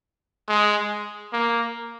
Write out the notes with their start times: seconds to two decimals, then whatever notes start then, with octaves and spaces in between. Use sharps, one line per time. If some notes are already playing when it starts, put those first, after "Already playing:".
0.48 G#3
1.33 A#3